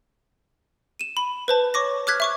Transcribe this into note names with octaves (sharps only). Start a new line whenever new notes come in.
D#7 E7
B5
B4 C5 A5
C#5 C#6 D6 A#6
D6 F6 F#6 G#6 B6
E5 C#6 D6